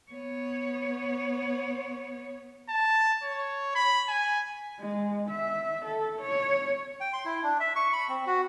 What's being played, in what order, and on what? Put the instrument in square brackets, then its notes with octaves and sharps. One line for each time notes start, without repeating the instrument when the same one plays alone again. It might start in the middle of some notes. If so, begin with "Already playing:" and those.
[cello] B3 C#5
[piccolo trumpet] A5
C#5
B5
G#5
[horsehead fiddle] G#3
E5
A4
C#5
[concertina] G5
C6
E4
D4
E5
C#6
B5
C4
F#4